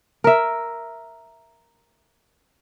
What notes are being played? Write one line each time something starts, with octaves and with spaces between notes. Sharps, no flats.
A#4 E5